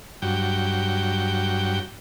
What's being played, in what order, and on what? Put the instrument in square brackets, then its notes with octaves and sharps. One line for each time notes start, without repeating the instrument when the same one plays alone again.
[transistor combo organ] G2 F#3 G5